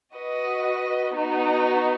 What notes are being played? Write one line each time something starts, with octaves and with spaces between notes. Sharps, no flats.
F#4 B4 D#5
B3 D#4 F#4